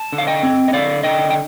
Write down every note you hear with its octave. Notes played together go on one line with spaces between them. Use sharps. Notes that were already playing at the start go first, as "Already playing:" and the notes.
Already playing: A5
D3
F5
D#5 G5
C4
D#5
D3 D5 F5
D3 D#5 G5
G5